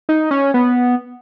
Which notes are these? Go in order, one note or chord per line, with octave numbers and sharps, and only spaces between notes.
D#4
C#4
B3